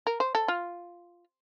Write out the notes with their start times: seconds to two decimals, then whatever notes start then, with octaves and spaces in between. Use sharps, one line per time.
0.07 A#4
0.20 C5
0.35 A4
0.48 F4